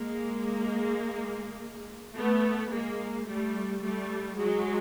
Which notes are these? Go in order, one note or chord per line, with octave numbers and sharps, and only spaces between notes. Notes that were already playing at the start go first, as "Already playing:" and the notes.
Already playing: G#3 A#3
A3 B3
G#3 A#3
G3 A3
G3 A3
F#3 G#3